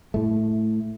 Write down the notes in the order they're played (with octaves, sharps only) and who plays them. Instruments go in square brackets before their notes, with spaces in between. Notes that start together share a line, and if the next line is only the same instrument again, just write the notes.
[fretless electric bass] A2 A3